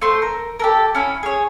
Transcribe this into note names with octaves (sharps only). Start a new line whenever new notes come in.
A3 C5 C6
A#4
G4 A4 A#4
C#4 E4 B5
G#4 C#5